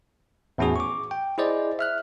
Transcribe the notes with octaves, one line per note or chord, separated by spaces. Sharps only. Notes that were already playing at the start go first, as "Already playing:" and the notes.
E2 A2 C#4 F#4 G#4
C#6 D6
G5
E4 G#4 C5 D5 D#5
E5 F6 F#6